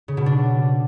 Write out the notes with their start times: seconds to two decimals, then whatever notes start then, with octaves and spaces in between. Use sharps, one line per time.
0.08 C#3
0.17 B2
0.26 D4